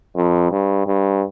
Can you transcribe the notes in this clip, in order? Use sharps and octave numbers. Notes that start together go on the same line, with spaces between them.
F2
G2
G2